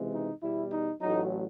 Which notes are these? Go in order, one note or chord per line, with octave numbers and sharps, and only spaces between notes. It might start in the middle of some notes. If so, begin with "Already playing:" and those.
Already playing: C#2 C3 E3 G#3
D#4
E2 B2 G3 E4
D#4
A1 A2 F#3 D#4